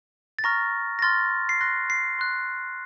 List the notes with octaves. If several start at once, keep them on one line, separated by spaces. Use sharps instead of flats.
A6
A#5 C#6 F6 A#6
A#6
C6 F6 A6
C7
C6 F#6 A#6
C7
C6 F#6